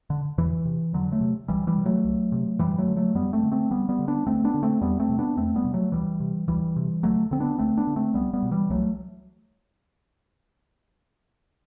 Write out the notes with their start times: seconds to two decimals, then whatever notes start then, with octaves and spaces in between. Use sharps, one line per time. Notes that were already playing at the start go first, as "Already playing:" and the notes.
0.10 D3
0.38 E2 E3
0.65 C3
0.93 E2 D3 F#3
1.12 F#3 A3
1.21 C3
1.48 C2 E3 G3
1.67 E3 G3
1.76 C3
1.86 F#3 A3
2.04 C2
2.32 C3
2.59 F#2 E3 G3
2.78 F#3 A3
2.87 D3
2.97 F#3 A3
3.15 F#2 G3 B3
3.33 A3 C4
3.43 D3
3.52 A3 C4
3.70 D2 G3 B3
3.89 G3 B3
3.99 D3
4.08 B3 D4
4.26 D2 A3 C4
4.44 B3 D4
4.54 D3
4.63 A3 C4
4.81 E2 G3 B3
5.00 A3 C4
5.09 C3
5.19 B3 D4
5.37 E2 A3 C4
5.56 G3 B3
5.64 C3
5.74 F#3 A3
5.92 D2 E3 G3
6.20 C3
6.48 D2 E3 G3
6.76 C3
7.03 D2 F#3 A3
7.31 D3 C4
7.40 B3 D4
7.59 D2 A3 C4
7.78 B3 D4
7.87 D3
7.96 A3 C4
8.14 C2 G3 B3
8.33 G3 B3
8.42 B2
8.51 E3 G3
8.70 C2 F#3 A3